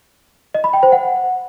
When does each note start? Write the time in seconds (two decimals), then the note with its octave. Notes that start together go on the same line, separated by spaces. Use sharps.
0.55 D#5
0.64 B5
0.73 G5
0.83 C5
0.92 F#5